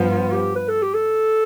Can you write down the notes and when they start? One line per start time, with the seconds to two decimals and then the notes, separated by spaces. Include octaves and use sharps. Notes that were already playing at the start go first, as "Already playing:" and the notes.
Already playing: G2 F3 B3
0.10 F4
0.32 G4
0.56 B4
0.69 A4
0.82 G4
0.94 A4